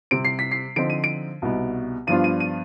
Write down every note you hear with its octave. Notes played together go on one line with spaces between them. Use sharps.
C3 G3 C4 D7
C7
B6
C7
D3 F3 C4 D#4 D7
D#7
D7
C2 B2 B3 D#4
G2 F3 B3 D4 F4 D#7
D#7
D#7